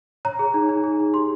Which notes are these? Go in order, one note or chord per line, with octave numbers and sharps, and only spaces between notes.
C#5 A#5
G#4
D#4
D#4
G#4
D#4
G4 C6